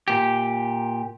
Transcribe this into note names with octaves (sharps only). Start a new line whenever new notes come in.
A#2 G4